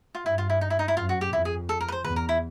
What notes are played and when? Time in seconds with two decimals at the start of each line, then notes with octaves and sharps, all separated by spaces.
0.15 F4
0.26 G2 E4
0.38 F4
0.50 E4
0.61 D#4
0.70 E4
0.79 D#4
0.88 E4
0.97 F#2 F4
1.09 F#4
1.21 G4
1.33 F2 E4
1.45 G#4
1.69 A4
1.81 A#4
1.88 B4
1.92 C5
2.04 E2 B4
2.16 A#4
2.29 E4